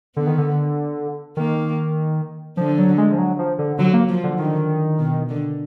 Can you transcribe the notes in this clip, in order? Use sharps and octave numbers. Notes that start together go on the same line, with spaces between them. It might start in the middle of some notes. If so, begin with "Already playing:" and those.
D3 B3
D#3
D3
D#3 A#3
D3 F3
F#3
G#3
F3
F#3
F3
D3
D3 F#3
A#3
F3
D3
D3 D#3
B2
D3